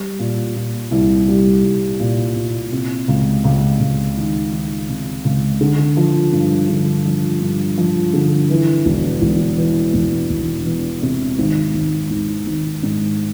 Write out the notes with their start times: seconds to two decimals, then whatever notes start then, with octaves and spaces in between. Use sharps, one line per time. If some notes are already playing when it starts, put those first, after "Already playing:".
Already playing: G3
0.19 A#2
0.56 A#2
0.91 C2
1.28 G3
1.64 C2
2.00 A#2
2.36 A#2
2.72 C3
3.08 C#2
3.44 C#2
3.80 C#2
4.17 D#3
4.52 D#3
4.89 C3
5.25 C#2
5.61 D3
5.97 F3
6.33 G2
6.69 D3
7.05 F3
7.41 G2
7.78 F3
8.14 D3
8.50 E3
8.86 E1
9.22 E1
9.58 E3
9.94 E1
10.30 E1
10.66 E2
11.02 C3
11.38 G#1
11.74 G#1
12.10 G#1
12.46 G#1
12.83 G#2